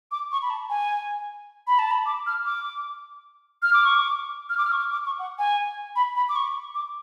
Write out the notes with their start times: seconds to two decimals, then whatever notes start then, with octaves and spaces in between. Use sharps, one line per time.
0.12 D6
0.32 C#6
0.42 B5
0.50 A5
0.69 G#5
1.67 B5
1.79 A5
1.91 B5
2.06 D6
2.27 F6
2.45 D6
3.62 F6
3.73 D6
3.84 C#6
3.95 D6
4.49 F6
4.57 D6
4.65 F6
4.72 C#6
4.79 D6
4.92 D6
5.06 C#6
5.19 F#5
5.38 G#5
5.96 B5
6.16 B5
6.29 D6
6.36 C#6
6.75 D6